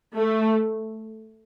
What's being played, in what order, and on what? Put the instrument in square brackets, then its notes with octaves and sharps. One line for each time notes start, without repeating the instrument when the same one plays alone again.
[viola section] A3